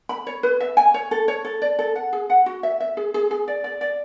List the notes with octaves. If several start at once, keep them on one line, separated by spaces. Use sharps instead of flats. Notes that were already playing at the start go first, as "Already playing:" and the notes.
B5
C#5
B4
E5
G#5
C#5
A4
C#5
A4
D5
A4
F#5
G#4
F#5
F#4
E5
E5
G#4
G#4
G#4
D5
D5
D5